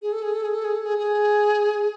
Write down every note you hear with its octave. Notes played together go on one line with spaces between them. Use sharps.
G#4
A4
G#4
A4
G#4
A4
G#4
A4
G#4
G#4